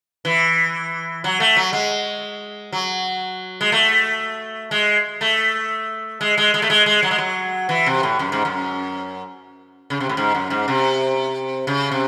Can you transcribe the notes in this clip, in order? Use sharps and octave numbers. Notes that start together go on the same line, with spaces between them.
E3
F#3
A3
F#3
G#3
F#3
G#3
A3
G#3
A3
G#3
G#3
G#3
A3
G#3
G#3
F#3
G#3
F#3
E3
C3
A2
F#2
G#2
F#2
C#3
C3
A2
G#2
F#2
G#2
C3
C#3
C3